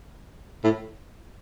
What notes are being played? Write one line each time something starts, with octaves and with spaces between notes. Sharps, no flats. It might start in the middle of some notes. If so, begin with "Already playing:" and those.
A2